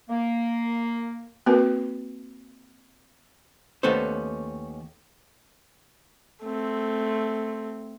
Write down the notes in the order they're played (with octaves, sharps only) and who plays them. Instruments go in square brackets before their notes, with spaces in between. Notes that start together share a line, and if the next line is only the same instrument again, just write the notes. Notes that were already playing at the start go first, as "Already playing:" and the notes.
[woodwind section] A#3
[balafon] A#3 C4 F#4 A#4 B4
[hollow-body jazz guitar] D#2 A3 B3 C#4 A4 C5
[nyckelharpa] A3 C4